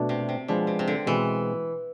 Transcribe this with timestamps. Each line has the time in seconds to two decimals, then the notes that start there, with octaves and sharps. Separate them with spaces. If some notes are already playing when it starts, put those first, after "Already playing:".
Already playing: B2 A3 D4
0.09 C3
0.29 C3
0.48 B2 F3 G#3 D4
0.67 C3
0.79 C3
0.88 D3
1.06 B2 E3 G#3 C4